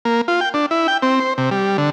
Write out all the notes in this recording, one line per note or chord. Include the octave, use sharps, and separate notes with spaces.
A#3
F4
G5
D4
E4
G5
C4
C5
C3
G3
D3